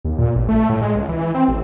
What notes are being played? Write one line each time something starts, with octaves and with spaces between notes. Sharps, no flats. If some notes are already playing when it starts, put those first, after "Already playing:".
D#2
A#2
A1
A3
A2
G#3
C#2
E3
C4
A1